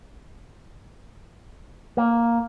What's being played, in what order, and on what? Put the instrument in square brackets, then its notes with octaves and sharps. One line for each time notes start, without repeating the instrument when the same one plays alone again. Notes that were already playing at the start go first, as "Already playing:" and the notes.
[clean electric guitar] A#3